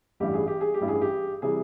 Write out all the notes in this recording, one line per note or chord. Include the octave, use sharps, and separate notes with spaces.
A1 G2 E3 G3 G4
G#4
G4
G#4
G4
A1 G2 E3 G3
G#4
G4
C3 E3 G3 G#4